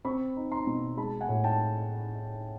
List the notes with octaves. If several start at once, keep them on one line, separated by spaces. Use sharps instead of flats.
C4 B5 C#6
D#4
A#5 C6
B2
G#3 A5 B5
F#5 G#5
A2
G5 A5